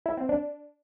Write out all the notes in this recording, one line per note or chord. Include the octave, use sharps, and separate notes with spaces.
E4
C4
D4